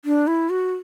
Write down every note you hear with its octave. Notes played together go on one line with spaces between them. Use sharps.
D4
E4
F#4